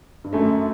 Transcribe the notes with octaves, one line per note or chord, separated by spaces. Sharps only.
G2
F#2 A3